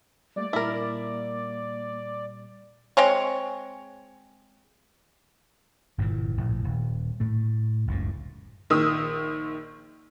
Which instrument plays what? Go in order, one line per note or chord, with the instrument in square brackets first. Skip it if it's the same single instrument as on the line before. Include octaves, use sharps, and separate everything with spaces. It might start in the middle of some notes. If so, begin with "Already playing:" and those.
[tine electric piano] G3 A3 A#3 [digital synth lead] D5
[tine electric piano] A#2 G3 [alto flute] A#3 [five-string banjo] E4 A#4
[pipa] G#3 C4 C#5
[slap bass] G1 G2 A#2 E3
A#1 A2
D#1
A2 A3
F#1 C#2 A2
[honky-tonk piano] A#1 D#3 D#6 E6